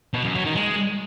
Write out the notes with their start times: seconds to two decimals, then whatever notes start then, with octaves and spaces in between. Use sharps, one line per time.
0.14 B2
0.24 F#2
0.35 F#3
0.45 D#3
0.56 G#3